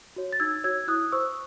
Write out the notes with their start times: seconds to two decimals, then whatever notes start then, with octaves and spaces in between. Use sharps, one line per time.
0.16 F#4 C#5
0.33 A6
0.40 D#4 E6 G#6
0.64 F#4 C#5 E6 G#6
0.87 E4 D#6 F#6
1.12 C5 C#6 E6